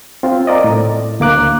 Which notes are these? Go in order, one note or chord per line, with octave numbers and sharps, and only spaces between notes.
C4 F4
A#4 D5 D#5
A2
D2 A#3 D6 F#6